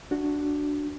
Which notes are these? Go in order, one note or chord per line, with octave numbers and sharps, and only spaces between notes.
D4 F#4